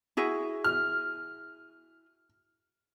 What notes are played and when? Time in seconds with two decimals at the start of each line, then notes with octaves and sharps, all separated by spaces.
0.17 E4 F#4 G#4
0.64 F6